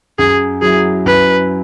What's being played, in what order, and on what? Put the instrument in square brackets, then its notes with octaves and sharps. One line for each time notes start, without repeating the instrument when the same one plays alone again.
[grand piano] F#2 [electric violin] G#4
[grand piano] F#3 E4 [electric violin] G#4
[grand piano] F#2 [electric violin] B4